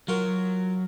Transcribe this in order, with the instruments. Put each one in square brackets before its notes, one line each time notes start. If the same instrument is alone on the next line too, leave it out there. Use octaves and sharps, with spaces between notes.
[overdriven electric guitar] F#3 [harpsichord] F4 F#4 A#4